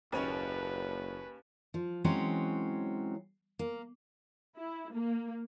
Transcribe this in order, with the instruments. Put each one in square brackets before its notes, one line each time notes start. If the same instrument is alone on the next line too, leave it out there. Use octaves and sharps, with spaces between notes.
[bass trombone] F#1 [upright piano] D#2 C#4 C#5 [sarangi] B4
[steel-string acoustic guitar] F3
E3 F#3 G#3 C4 C#4
A#3
[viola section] E4
A#3